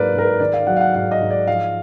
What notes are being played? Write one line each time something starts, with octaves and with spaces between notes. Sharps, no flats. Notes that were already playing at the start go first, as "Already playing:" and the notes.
Already playing: G#2 F#3 A#3 A#4 B4 D5 F5
G#2 A#4
B4
D#3 D5
F5
F#3 F#5
F5
F#5
G#2 F5
D#5
G#2
D5
F3 F5